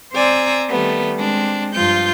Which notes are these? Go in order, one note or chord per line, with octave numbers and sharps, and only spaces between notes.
C4 C5 D5 G#5 A#5 E6
D#3 G3 A3 B3
G#3 C4 D4
G2 F3 F4 G6